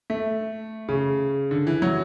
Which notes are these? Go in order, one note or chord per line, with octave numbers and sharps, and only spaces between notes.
A3
C#3
D3
E3
F#3